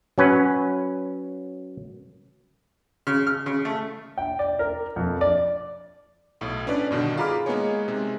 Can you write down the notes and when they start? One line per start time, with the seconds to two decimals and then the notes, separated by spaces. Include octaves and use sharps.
0.18 F#3 C#4 B4
3.07 C#3
3.27 F6
3.46 C#3
3.65 A3
4.18 G5
4.39 D5
4.59 A#4
4.96 F2
5.21 D5
6.41 B1 A2
6.67 C#4 D4 B4 D5
6.91 G2 B2 D3 D#3
7.17 F4 G#4 A#5 B5 D6 F6
7.46 G#3 A#3 B3 D#4 G#4 C#5
7.88 C3 G#3